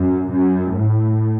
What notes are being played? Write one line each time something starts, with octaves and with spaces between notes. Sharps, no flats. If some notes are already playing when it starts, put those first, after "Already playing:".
Already playing: F#2
F#2
A2